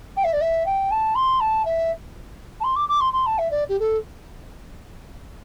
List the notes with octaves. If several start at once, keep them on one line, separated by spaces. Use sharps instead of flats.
G5
E5
D5
E5
G5
A5
C6
A5
E5
A5
C6
D6
D6
C6
C6
A5
E5
D5
G4
A4